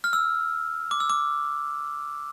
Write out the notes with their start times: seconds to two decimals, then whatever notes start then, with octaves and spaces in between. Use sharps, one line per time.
0.04 F6
0.13 E6
0.91 D6
1.00 E6
1.10 D6